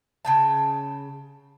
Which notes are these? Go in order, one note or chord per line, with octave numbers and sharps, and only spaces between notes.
C#3 G5 A5